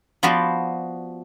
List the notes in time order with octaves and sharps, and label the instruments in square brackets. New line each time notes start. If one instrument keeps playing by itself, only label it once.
[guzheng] F3 B3 F#4 B4 C5 D5